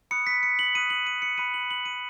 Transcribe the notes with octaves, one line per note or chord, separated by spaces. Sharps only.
B5 D#6 F#6 C#7
B6
C#7
F#7
B5 D#6 F#6 D#7
F#7
D#7
C#7
B5 D#6 F#6 D#7
F#7
F#7
D#7